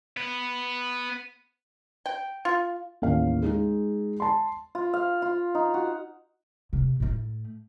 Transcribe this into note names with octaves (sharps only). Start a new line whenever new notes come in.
B3
G5
F4
A1 D#2 F5
G#3 D#4 G#4
A5 C6
F4
F5
F4
D#4
F#4
C3 B3
A2 A3